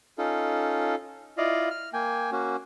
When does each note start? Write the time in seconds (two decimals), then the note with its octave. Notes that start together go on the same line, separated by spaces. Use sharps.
0.18 C#4 D#4 F4 A4
1.38 E4 F4 D5 D#5 F5
1.70 F6
1.93 A#3 G5 G#5
2.32 A#3 C#4 F#4